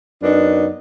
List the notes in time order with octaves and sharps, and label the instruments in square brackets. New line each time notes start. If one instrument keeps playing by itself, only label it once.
[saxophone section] F#2 B3 D4 D#4